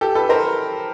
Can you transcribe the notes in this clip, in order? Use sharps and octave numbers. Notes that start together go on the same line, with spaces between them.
G4 A4
A4 B4
A#4 C5